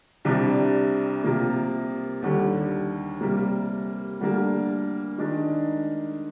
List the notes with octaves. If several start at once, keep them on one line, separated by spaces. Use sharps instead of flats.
C2 C3 G3 D4
C3 F3 A#3
D#2 D3 G3
C3 G3 A#3
D2 D3 G3 A#3 D4
D#3 G#3 D4